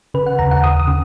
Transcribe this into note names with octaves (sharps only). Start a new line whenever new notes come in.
C#3 B4
F#5
D#2 A#5
F#5
D#2 D#6
D#6
C#3